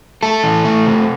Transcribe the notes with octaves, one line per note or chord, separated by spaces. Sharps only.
A3 A4
E3
A3
C3